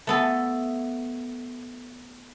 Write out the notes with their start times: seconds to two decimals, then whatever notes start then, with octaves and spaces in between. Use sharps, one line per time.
0.07 A3 B3 A4